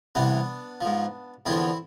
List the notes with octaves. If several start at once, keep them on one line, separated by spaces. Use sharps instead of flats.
C2 C3 E3 B3 D4
G#2 F3
E2 D3 F3 C4 E4